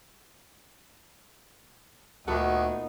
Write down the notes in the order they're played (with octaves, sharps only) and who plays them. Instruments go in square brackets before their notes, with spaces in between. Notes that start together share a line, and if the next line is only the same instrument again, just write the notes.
[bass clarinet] D2 [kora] A#2 B3 A4 [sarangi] D#4 [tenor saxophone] F#4